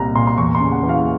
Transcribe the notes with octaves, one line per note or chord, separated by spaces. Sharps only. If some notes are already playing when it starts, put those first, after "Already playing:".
Already playing: C2 A#2 A#5
A#2 C6
C6
E2 C#6
C6
C#3
F#5
E3
F5